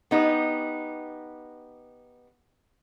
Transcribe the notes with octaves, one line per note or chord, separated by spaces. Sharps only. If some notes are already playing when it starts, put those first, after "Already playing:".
B3 D#4 G4